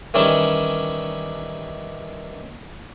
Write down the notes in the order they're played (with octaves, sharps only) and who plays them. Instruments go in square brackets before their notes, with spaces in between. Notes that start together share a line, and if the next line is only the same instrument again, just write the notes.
[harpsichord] D#3 E3 G3 C#4